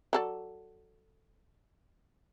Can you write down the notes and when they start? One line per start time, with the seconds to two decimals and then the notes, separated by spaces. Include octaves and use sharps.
0.13 F#3 A4 D5